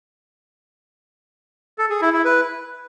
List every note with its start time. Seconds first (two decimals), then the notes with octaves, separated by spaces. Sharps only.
1.78 A4
1.90 G#4
2.02 E4
2.13 E4
2.25 B4